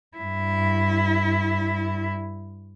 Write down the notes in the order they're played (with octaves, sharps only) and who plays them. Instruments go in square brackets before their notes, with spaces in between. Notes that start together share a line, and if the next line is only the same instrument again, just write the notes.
[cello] G2 E4